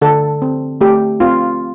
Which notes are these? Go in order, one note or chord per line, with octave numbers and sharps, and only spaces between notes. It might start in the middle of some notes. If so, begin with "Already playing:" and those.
D3 A4
C4
A3 G4
C4 F4